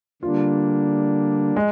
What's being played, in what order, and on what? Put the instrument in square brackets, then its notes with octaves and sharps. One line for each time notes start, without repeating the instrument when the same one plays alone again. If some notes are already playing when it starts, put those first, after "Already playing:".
[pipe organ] D3 G3 A#3 D4 [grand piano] F4
[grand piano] G#3